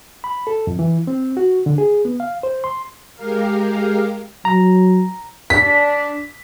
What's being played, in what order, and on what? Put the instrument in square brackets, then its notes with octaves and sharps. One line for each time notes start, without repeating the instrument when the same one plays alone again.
[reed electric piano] B5
A4
F2
E3
C4
F#4
D3
G#4
B3
F5
C5
C6
[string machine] G#3 G4 A#4 F5
[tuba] F#3 [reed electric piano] A#5
[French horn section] D4 [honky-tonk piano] B6